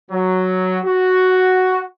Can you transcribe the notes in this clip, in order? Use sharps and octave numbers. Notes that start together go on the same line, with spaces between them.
F#3
F#4